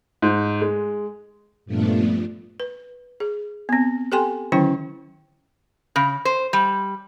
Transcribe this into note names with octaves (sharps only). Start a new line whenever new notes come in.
G#2
G#3
G2 A#2 F3 A3 B3 D4
B4
G#4
B3 C4
G4 A4 G5 G#5 C6
D3 D#3 F#3 C#4 E4 G5
C#3
C5
G3